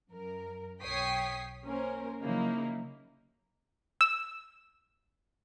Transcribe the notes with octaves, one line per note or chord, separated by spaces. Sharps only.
F#2 A#4
B1 C#5 G5 D#6 B6 C7
A#3 C#4 A#4 C5
C#3 F3 F#3 A#3 D#4 E4
E6